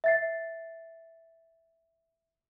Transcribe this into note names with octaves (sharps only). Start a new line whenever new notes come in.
E5 A6 C7